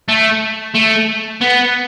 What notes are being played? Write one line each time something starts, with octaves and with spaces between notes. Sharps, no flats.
A3
A3
B3